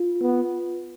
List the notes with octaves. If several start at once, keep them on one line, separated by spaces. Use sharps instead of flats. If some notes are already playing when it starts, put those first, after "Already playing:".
Already playing: F4
B3